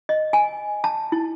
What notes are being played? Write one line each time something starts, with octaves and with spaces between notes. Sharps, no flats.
D#5
G#5
A5
E4